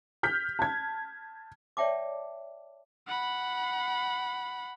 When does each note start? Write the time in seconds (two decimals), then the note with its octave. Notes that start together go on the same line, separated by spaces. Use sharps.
0.23 F6 G6 B6
0.59 A5 G#6
1.77 C#5 D5 E5 G5 A5 D6
3.07 F#5 B5